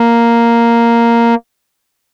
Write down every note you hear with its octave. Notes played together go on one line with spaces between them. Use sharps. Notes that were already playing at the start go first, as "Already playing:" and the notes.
Already playing: A#3